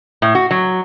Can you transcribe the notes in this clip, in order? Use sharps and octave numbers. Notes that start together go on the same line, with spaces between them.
A2
F#4
F#3